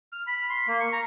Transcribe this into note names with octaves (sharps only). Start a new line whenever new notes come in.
F6
B5
C6
A#3
C#6
A#5